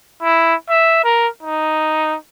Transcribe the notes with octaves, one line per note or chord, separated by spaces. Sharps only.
E4
E5
A#4
D#4